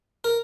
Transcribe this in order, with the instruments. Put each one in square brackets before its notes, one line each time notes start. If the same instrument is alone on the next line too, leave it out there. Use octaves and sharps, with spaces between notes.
[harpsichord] A#4